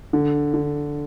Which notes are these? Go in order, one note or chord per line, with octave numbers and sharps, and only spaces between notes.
D3
D3